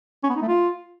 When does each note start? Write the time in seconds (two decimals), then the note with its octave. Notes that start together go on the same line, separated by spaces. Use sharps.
0.24 C#4
0.30 B3
0.36 D#4
0.42 A3
0.48 F4